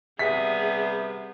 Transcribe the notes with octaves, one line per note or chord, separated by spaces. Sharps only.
C3 G3 B3 G#4 E5 B6